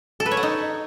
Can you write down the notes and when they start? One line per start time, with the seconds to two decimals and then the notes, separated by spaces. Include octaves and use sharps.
0.20 A4
0.26 B4
0.31 C#5
0.37 F#5
0.43 D#4